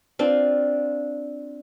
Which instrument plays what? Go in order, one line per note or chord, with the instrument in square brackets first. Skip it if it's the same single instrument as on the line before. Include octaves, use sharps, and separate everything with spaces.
[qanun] C4 D4 F4